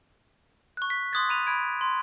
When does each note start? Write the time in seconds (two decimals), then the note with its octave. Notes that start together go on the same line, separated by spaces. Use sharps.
0.77 C#6 F#6
0.90 B6
1.13 C6 D6 D#6 F#6 G#6 A6
1.29 B5 F#6 D#7 F7
1.47 B5 G#6 D7
1.81 C6